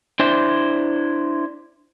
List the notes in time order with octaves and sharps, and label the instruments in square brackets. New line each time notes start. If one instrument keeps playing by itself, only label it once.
[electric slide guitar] D4 E4 C5